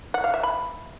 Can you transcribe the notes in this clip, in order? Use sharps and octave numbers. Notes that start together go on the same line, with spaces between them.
F#5
F5
E5
B5